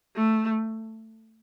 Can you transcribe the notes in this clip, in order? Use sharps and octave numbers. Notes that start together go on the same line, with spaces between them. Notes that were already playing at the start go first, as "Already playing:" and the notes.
A3